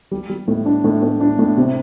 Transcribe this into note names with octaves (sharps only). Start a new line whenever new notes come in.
G3
G3
A2
D4
A2
A2
D4
A2
C3